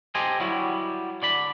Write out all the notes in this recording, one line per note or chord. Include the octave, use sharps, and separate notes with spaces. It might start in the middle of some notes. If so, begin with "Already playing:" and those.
G4 A4 C5 D#5 G#5
F#3 G3 E4 F#4
D3 D5 B5